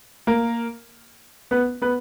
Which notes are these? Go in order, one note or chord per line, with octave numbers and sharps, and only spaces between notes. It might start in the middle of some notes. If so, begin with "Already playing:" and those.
A#3 A#4
B3 B4
B3 B4